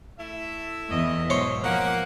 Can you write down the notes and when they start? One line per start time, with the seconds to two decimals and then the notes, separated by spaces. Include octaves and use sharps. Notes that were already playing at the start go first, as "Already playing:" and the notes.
0.19 A3 E4 E5
0.90 E2 D#5
1.30 G#2 B2 F#3 C5 C#5
1.63 F3 A#3 F#5